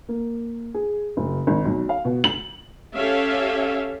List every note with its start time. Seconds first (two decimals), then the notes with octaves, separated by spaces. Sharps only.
0.09 A#3
0.74 G#4
1.17 F#1
1.47 G#1
1.65 B1
1.89 F5
2.05 B2
2.24 F#7
2.95 C#4 G4 A4 E5 F5